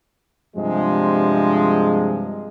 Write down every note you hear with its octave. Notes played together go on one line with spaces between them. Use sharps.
G2 C3 F3 G#3